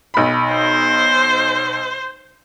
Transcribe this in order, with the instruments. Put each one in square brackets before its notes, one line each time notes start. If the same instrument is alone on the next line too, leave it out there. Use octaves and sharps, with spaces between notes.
[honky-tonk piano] B1 B5
[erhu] C5